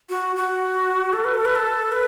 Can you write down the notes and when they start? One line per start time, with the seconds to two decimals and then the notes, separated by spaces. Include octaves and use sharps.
0.09 F#4
0.36 F#4
1.13 A4
1.24 B4
1.34 A4
1.45 B4
1.55 A4
1.92 B4